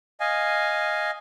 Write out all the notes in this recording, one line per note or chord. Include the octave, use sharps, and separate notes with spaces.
D#5 F5 G#5